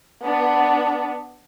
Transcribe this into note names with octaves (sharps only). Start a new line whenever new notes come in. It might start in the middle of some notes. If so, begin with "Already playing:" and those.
B3 D4